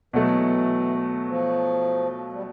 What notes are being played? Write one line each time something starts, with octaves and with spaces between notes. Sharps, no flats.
B2 E3 F#3 A3
F3
G3